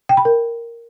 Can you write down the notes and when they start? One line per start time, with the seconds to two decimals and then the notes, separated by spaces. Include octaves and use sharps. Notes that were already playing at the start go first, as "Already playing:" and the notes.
0.09 G5
0.17 B5
0.25 A#4